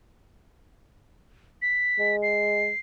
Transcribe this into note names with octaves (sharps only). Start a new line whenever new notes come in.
B6
G#3
C7